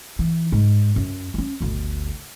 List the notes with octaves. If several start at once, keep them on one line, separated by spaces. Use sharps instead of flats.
E3
G#2
F#2
C#4 D#4
G1 D2